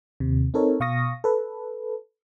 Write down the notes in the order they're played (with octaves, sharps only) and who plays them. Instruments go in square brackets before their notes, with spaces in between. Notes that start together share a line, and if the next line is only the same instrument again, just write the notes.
[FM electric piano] D#2 C3
C4 D#4 A4 A#4 C#5
B2 F5 C#6 D#6 A#6
A4 B4